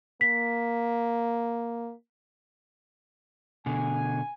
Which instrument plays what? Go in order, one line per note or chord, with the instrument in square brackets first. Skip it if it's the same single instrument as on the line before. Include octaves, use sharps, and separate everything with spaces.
[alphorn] A#3 [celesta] B6
[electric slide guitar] B2 D3 [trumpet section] G#5